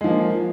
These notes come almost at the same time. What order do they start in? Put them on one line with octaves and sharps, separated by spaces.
G#3 F3 A#3